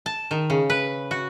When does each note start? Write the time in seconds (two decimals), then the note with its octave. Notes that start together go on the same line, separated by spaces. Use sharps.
0.06 A5
0.31 D#3
0.50 C#3
0.70 B4
1.11 F#4